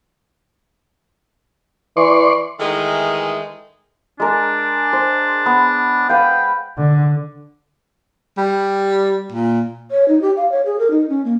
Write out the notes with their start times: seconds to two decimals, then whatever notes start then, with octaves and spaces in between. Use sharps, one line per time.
1.97 E3 D5 C6 C#6
2.60 D#3 E3 G#3 A3 D#4
4.20 G#3 D4 A#4
4.93 C5
5.46 B3
6.09 B4 F5 G5
6.78 D3
8.38 G3
9.33 A#2
9.91 C#5
10.08 D#4
10.22 G4
10.37 F5
10.52 C#5
10.66 G#4
10.79 A#4
10.91 D#4
11.09 C#4
11.25 A#3